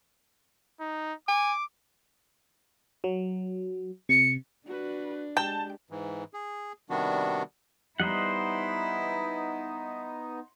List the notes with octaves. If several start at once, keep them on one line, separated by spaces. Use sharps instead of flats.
D#4
G#5 D6
F#3
C3 C#7
D4 F#4 B4
G#3 G4 G5 A5
G#2 E3
G#4
C3 D#3 G3 B3 D4 F#4
G3 B3 D#4 E4 C5 D#5 F#5